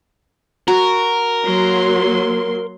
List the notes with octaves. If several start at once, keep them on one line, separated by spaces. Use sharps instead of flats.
F#4 A#4
F#3 A#3 C6